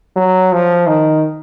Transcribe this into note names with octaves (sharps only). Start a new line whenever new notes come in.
F#3
F3
D#3